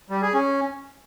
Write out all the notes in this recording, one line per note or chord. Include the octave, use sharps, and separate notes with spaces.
G3
G#4
C#4